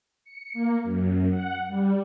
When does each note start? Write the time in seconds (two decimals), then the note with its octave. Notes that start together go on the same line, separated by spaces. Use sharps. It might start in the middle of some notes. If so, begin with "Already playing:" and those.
0.24 C#7
0.54 A#3
0.84 F#2
1.30 F#5
1.68 G3